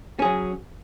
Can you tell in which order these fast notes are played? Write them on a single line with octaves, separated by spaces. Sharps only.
C#4 G#4 F#3